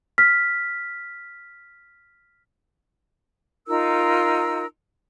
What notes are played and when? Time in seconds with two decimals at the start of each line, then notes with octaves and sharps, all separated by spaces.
0.18 F6 B6
3.67 D#4 F4 A#4 E6